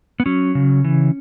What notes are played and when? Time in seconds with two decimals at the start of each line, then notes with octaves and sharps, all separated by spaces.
0.20 B3
0.26 F#3 C#4
0.55 C#3
0.84 E3